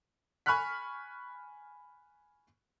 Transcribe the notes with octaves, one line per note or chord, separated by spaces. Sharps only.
G#5 B5 C#6 F6 F#6 B6